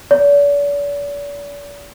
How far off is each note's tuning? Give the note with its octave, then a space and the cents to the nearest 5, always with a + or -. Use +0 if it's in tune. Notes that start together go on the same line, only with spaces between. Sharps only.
D5 -45